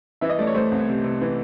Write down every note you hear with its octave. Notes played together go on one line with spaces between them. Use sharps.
E3 E5
D#5
A3 D5
C#5
A3 C5
C2
C3
C3
E3